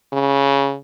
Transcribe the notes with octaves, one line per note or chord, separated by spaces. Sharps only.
C#3